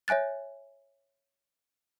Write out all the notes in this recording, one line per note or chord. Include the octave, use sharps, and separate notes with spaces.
C#5 E5 G#5 F#6 A6